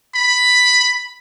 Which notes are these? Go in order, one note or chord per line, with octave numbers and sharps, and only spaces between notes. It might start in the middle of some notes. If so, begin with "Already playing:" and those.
B5